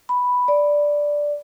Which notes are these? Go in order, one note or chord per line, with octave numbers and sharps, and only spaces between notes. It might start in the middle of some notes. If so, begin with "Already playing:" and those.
B5
D5